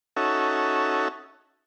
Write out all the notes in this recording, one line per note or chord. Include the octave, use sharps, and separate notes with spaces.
C#4 D#4 F#4 A4 E5